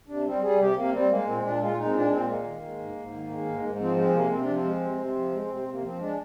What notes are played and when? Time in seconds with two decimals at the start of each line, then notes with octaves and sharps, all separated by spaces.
0.08 C3 D4
0.25 G3 C4
0.42 G3 G#4
0.58 C3 G4
0.75 C3 A#3
0.92 G3 C4
1.09 G#3 A#3
1.26 A#2 C4
1.43 A#2 D4
1.61 G#3 F4
1.77 G#3 D#4
1.86 C4
1.93 A#2 D4
2.10 A#2 C4
2.27 G#3 A#3
2.44 D#3
2.61 G#3
2.78 G#2
2.95 G#2
3.12 D#3
3.29 G#3
3.46 G#2
3.63 G#2
3.79 F3 C4
3.96 G#3 C4
4.14 C3 A#3
4.30 C3 C4
4.41 D4
4.48 F3 C4
4.64 G#3
4.81 C3
4.98 C3
5.15 F3
5.32 G#3
5.49 C3
5.66 C3
5.72 A#3
5.83 F3 C4
5.99 G#3 D4